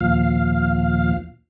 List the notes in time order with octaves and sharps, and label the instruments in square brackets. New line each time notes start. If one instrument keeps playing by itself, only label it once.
[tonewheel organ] D#2 A#2 F3 F5